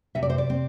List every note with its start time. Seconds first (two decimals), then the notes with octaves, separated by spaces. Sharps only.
0.15 C3 E5
0.23 D5
0.30 C5
0.38 D5
0.50 C4